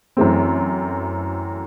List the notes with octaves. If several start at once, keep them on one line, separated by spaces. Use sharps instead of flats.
F#2 E3 A3 C4